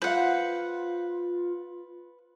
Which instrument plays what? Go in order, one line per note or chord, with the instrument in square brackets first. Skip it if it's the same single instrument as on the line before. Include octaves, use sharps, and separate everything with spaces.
[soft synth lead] F4 [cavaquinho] B4 F#5 [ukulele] C5 F5